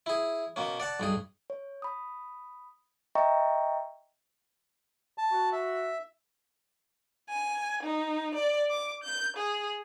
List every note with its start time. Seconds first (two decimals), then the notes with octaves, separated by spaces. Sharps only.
0.06 E4 G#4
0.56 B2 A#3 C#4
0.80 D5 F#5 A5
1.00 B1 G2 G#4
1.50 C#5
1.82 B5 D#6
3.15 D#5 E5 G5 A#5 C#6
5.18 A5
5.32 F#4
5.52 E5
7.30 G#5
7.83 D#4
8.35 D5
8.70 D6
9.03 G6
9.37 G#4